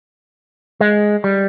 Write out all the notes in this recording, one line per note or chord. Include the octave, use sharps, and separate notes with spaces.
G#3
G3